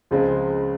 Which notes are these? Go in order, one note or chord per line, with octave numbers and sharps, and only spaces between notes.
C#2 C#3 F3 G#3 C4